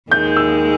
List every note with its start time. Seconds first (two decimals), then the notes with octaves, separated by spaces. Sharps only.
0.11 D#2 D#3 G#3 G6
0.37 E6